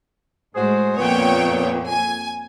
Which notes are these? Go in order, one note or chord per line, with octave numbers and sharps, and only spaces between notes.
A2 G#3 F#4 G#4 C5
F2 A#2 A#3 B3 C#5 G5
G#5